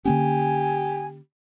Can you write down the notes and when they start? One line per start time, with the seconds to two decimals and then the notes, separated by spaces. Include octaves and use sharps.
0.05 D3 A#3 C#4 G4 G#5